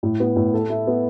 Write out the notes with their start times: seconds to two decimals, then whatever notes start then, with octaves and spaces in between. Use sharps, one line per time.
0.03 A2
0.20 B3
0.36 A2
0.54 A4
0.70 E4
0.87 B3